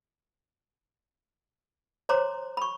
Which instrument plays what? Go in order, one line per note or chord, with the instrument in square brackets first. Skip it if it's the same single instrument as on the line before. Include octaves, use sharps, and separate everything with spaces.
[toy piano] C5 C#5 A#5 C6 D6
B5 C#6